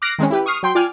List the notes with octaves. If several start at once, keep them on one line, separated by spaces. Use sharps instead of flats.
D6 F6 F#6 A#6 C7 D7
D#3 G#3 C4 C#4
E4 G4 B4
C#6 D#6 F6 C7
F#3 G5 C6
F4 D5 G5 G#5 F6